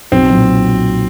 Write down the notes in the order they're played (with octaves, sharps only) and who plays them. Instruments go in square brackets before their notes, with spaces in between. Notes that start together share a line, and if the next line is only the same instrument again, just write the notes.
[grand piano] B1 [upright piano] C4
[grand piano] A#2 F#3